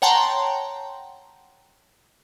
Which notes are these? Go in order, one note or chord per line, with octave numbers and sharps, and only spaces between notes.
C#5 F#5 G5 A5 A#5 C6